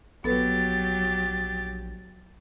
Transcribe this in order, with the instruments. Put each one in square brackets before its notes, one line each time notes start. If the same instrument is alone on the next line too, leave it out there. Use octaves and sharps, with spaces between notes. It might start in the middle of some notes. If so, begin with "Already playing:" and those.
[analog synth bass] A#1 [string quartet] F#3 G4 A6 [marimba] B3 A4 B4